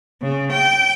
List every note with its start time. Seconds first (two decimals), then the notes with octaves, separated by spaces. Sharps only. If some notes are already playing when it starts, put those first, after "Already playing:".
0.22 C#3
0.53 G5